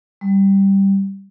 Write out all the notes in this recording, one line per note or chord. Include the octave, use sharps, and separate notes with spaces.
G3